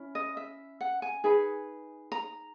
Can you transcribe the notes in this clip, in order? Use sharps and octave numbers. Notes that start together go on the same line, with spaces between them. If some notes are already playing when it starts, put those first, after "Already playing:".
Already playing: C#4 E4
D#5
E5
F#5
G#5
D#4 G#4 B4
A#5